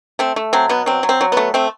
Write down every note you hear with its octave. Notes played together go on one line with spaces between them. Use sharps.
A3 C4
A3
F#3 C4
B2 B3
F#3 C4
F#3
C4
F#3
A3 B3
A3 C4